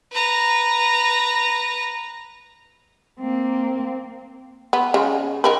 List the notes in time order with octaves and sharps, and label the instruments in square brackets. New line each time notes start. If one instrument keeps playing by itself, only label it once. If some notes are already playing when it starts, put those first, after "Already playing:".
[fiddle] B4 A#5
[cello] A#3 C4
[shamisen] B3
C#3 G#3
D#3 A#4 B4